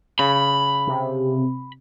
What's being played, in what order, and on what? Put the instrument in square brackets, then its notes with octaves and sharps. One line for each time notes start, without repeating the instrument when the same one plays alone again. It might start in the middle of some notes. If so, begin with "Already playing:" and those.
[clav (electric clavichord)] C#3 [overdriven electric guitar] B5
[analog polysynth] C3